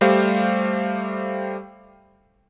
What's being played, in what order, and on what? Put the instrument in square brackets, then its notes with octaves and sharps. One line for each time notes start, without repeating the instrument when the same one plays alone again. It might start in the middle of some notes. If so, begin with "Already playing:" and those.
[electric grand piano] G3 A3 G4 C5 F5